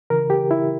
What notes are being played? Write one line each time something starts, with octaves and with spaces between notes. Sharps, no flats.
C#3 E3 A#4
G4
E4